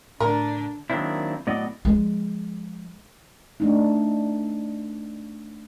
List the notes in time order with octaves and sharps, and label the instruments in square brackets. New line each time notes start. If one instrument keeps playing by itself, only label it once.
[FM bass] A2 [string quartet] D3 D4 [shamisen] A#4
[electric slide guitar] D#3 F#3 A#3 C4 D4 E4
A2 F#3 B3 D5 D#5
[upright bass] F3 G#3
[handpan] A3 D4 D#4